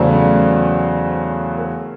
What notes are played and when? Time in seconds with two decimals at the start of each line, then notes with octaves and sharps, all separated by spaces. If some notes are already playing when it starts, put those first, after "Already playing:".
Already playing: E2 C#3 F#3 A3 C5 D5
1.58 A#4 C5